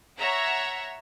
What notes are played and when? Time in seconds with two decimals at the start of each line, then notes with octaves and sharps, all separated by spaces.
0.19 C#5 E5 F#5 A#5